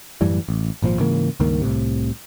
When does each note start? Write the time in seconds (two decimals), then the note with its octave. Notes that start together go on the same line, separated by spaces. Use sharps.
0.21 F#2 A2 E3 G3
0.49 A1
0.82 G#1 A#2 D#3 F3
0.99 G#2 C#3 E3 A#3
1.40 C#2 G2 D#3 A#3
1.62 C2 A2 C3